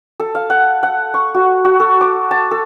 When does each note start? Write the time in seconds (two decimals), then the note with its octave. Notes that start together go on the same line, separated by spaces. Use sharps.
0.20 A4
0.35 F5
0.50 F#5
0.83 F#5
1.14 C#6
1.34 F#4
1.65 F#4
1.80 A4
2.01 D6
2.31 A5
2.51 A4